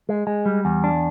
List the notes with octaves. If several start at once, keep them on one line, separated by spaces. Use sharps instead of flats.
G#3
G#3
G3
E2
D4